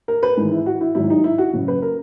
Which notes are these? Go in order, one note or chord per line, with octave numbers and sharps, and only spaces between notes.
A#4
B4
G#1 G#2 E3 G#3
E4
F#4
E4
G#1 G#2 D#3 F#3 E4
D#4
E4
F#4
F#1 F#2 C#3
B4
A#4